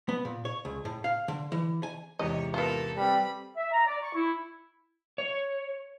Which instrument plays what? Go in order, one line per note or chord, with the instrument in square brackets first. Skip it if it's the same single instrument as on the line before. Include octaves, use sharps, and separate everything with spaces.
[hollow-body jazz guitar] B3
A#2
C#5
C#2
A2
F5
D3
E3
G#5
[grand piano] E2 G#2 C3 [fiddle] C#5 [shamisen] D#5
[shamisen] B3 F4 [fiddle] A4 A#4
[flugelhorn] G3 [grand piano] C4 B4 [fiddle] B5
[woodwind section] E5
A#5
D5
C#6
E4
[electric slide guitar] C#5